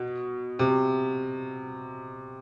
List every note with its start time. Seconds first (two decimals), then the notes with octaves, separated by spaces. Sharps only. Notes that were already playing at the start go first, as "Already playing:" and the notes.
Already playing: B2
0.59 C3